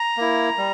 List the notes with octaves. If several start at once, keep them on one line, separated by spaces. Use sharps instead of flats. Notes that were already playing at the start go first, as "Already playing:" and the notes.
Already playing: A#5
A#3 E4
G3